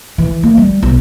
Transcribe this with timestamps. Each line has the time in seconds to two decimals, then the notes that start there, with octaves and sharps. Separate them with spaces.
0.18 E3
0.43 A#3
0.57 G3
0.83 B1